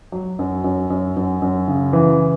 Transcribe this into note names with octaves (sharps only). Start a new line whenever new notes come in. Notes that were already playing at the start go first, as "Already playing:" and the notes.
F#3
F#2
F#2
F#2
F#2
F#2
C#3
E3